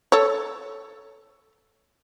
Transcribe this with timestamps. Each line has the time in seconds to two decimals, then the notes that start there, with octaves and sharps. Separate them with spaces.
0.12 A4 C#5